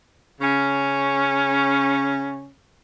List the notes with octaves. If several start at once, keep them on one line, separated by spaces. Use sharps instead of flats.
C#3 C#4